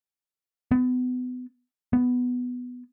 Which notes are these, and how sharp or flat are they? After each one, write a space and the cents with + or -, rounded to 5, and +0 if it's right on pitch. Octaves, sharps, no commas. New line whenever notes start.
B3 +30
B3 +5